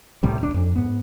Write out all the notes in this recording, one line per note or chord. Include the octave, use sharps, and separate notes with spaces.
C2 A2 C3 G3
D1 D4
F2
G#2 B3